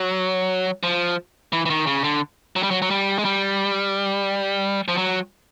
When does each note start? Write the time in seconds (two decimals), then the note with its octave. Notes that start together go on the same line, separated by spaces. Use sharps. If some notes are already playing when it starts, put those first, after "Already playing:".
Already playing: F#3
0.83 F3
1.53 E3
1.66 E3
1.70 D#3
1.87 C#3
2.04 D3
2.56 F#3
2.63 G3
2.71 F#3
2.82 F#3
2.90 G3
3.18 G#3
3.25 G3
4.88 F3
4.97 F#3